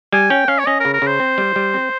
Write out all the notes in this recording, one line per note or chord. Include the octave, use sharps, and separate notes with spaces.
G3 G#5
C#4 G5
C#4 F5
C#5
C#4 D#5
A#4
C#3
A#4
C#3
C5
C4
G3
G3
C4